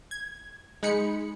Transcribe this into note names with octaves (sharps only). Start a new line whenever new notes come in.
G#6
G#3 D#4 B5 C#7